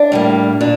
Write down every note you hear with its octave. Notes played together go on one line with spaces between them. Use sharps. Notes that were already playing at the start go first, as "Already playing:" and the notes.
Already playing: D4
A2 G3 A#3
A#2 D4